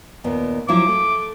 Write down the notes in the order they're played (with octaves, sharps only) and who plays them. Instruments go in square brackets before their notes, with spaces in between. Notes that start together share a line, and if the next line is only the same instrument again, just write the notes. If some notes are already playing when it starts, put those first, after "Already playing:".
[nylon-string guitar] D#2 A#2 B3
[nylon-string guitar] F3 F#3 E4 [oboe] D6
[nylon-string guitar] A3